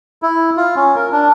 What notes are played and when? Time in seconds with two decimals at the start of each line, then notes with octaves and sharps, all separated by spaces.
0.22 E4
0.57 F4
0.76 C#4
0.95 A#4
1.12 D4